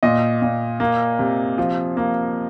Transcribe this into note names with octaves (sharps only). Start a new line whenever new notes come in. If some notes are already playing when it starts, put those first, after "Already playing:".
A#2 D#5
A#2
A#3
C3
F3
A#3